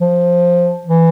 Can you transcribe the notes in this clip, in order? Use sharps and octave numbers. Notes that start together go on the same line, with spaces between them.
F3
E3